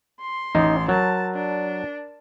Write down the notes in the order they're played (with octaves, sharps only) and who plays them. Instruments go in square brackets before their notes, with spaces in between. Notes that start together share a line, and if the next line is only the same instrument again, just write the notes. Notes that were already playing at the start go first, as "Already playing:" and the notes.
[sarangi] C6
[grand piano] A1 [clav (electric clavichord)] D#4
[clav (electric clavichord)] F#3 [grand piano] A#4 [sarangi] A5
[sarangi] D4